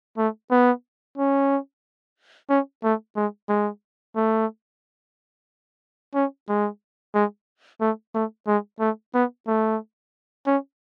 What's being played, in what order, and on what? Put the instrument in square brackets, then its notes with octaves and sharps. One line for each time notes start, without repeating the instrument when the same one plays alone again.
[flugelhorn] A3
B3
C#4
C#4
A3
G#3
G#3
A3
C#4
G#3
G#3
A3
A3
G#3
A3
B3
A3
C#4